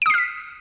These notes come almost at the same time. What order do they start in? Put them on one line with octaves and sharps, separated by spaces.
D7 D#6 C7 F6 B6